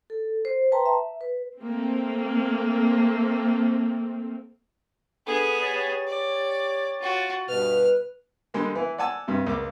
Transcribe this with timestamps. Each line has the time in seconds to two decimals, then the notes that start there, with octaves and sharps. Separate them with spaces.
0.10 A4
0.45 C5
0.72 B4 G5 A5 A#5 C6
0.86 E5
1.21 B4
1.60 A3 A#3 C4
5.27 B3 D4 G#4 A4
5.62 G4 C#5 A6
6.07 D5
7.00 F4 F#4
7.49 G2 B2 B4 F6
8.54 D3 G3 G#3 A#3
8.75 E3 E4
8.98 D5 F#5 G#5 A5 E6
9.28 G2 C3
9.46 C#2 A#3 D6